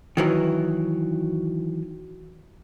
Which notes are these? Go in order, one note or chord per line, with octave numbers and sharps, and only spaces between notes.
D#3 E3 F#3